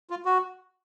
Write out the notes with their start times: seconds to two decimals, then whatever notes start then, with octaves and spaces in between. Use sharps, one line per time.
0.10 F4
0.25 F#4